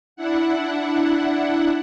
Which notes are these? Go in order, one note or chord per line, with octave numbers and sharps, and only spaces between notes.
D4 E4 F#5